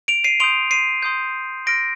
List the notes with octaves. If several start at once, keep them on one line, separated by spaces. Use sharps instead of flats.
D7 F7
C7 D#7
C6 D#6 G6 D7 F7
C7 D#7
C6 D#6 G6
C6 F6 A#6 D7